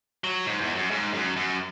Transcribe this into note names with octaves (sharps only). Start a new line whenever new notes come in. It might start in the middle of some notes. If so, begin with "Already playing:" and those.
F#3
G#2
E2
F#2
G#2
F#2
F#2